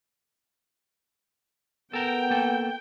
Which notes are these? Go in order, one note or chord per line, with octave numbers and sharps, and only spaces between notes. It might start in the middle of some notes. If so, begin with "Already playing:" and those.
B3 A4 A#4 G5
A#3 A4